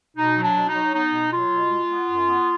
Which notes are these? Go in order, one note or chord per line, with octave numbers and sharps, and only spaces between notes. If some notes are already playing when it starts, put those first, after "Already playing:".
B2 D#4
F#3
D4
B2
D#4
F#3
B3 D#4
B2
F#3 F4
B2
G#3
B3
F#2
B3